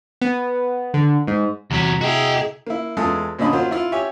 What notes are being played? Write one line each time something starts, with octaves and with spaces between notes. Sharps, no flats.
B3
D3
G#2
E2 C3 F#3 A#5 B6
E4 F#4 G#4 D#5 G5
A#3 E4
E2 G#3 F4 A4 D#6
F#2 A#2 D3 D#5 B5
F#3 A#3 F4 C5
E4 F4
G4 C#5 E5 G#5